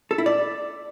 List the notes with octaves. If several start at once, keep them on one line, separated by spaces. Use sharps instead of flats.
A4
E4
D5